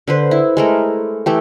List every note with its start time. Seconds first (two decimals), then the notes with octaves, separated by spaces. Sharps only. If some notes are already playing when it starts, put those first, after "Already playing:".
0.08 D3 B4 C5
0.31 E4
0.57 G#3 A3 A#4
1.26 E3 A3 G4